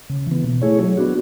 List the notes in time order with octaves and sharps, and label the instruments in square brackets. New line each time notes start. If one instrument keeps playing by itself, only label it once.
[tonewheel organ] C#3
E3
B3
B2
A3 E4 G#4 C#5
F#3
B3 D4 F#4